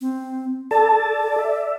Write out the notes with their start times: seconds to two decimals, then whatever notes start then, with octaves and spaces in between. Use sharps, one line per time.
0.01 C4
0.71 A4 D5 A5
1.39 E5